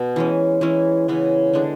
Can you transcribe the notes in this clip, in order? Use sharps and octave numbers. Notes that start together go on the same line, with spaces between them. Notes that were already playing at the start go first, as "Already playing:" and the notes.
Already playing: B2 B3
E3 G#3 C#4
E3 G#3 C#4 E4
C#3 E3 B3
D3 G#3 D4